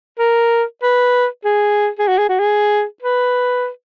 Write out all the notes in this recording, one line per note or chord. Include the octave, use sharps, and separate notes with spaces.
A#4
B4
G#4
G#4
F#4
G#4
F#4
G#4
B4